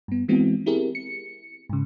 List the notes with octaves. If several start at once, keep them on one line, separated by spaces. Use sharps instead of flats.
G2 B3
E3 G#3 B3 C4 E4 F#4
C4 E4 G4 G#4 A#4
C#7
G#2 C#3